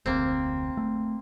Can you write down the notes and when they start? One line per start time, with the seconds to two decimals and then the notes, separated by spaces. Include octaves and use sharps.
0.06 F1 D2 A#3 C4
0.77 A3